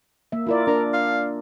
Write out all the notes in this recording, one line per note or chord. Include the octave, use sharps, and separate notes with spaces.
A#3 E5
E4 F4 A#4 D5
D4 A#4 D5
F5